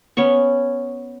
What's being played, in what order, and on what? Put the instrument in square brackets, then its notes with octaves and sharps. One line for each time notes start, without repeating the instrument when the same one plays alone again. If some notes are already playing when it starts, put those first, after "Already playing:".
[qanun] B3 C#4 C#5 C#6